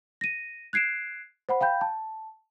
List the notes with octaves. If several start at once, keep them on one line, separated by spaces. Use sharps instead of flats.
A#6 D#7
F#6 G#6 C7 D7 E7
C5 F#5 B5
F5 G5 B5 G6
A5